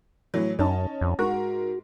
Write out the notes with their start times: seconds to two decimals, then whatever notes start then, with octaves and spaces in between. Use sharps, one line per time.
0.34 A2 E3 F#3
0.59 F#2 C#4 D#4 A5
1.01 F2
1.19 G#2 F#4 A#4